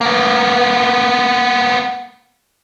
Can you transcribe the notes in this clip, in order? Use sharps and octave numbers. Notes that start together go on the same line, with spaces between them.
A#3 B3